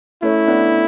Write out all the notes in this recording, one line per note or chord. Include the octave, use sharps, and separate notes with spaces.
A3 C#4 E4
B3 D4